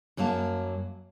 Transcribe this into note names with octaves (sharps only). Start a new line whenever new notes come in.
F#2 F#3 A#3 F5 A5